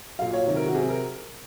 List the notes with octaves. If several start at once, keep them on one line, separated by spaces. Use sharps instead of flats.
A#2 F#3 F5
C#5
C3 D#3 F#3
A#4
F#4
C3 F#3 G#4
A#4